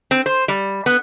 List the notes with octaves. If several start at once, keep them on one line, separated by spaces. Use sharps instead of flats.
C4
C5
G3
B3